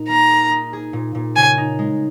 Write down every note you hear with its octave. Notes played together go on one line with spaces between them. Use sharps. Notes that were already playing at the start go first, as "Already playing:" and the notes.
Already playing: A#2 D#4
A#3 A#5
G#4
D#4
G#4
A#2
A#2
C#3 G#5
D#4
G#3